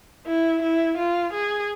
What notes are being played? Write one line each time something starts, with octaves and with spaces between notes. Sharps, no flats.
E4
E4
F4
G#4